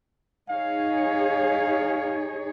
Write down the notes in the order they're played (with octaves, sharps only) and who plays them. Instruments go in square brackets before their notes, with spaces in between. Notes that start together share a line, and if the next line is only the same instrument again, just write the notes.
[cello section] D#4 G#4 C#5 [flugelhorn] F5